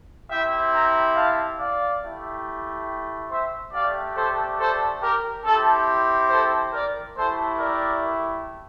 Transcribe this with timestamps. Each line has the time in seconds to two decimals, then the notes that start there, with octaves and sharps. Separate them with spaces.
0.29 C4 E4 G4 E5 G5
0.73 G5 A#5
1.16 F5 A5
1.58 D5 F5
2.02 A3 E4 G4
3.30 C5 E5
3.72 A3 D4 G4 D5 F5
4.16 A4 C5
4.59 A4 C5
5.02 G4 A#4
5.44 C4 E4 G4 A4
6.30 A4 C5
6.73 A#4 D5
7.16 A3 E4 G4 A4 C5
7.59 A#4 D5